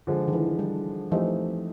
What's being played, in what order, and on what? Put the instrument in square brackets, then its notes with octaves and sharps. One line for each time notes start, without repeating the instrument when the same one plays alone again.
[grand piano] D3 F3 G#3
[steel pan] D#3
E3
G3
[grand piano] E3 A3 C4 D#4 G4 [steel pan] F3